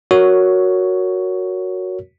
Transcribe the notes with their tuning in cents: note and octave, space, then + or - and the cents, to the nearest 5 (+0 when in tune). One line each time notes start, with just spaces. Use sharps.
F#4 -5 A#4 +0 C#5 +10